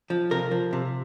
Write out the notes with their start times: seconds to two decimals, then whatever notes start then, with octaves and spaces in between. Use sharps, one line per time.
0.10 F3
0.31 C3 A#4
0.51 F3
0.73 C3